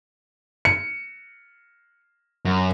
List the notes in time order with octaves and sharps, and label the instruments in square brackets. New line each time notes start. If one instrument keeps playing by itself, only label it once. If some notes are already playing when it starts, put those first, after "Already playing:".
[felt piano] C#7
[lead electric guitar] F#2